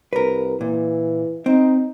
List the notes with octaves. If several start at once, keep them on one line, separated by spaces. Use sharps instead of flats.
C2 A#4 B4
A#2 E3
C4 D#4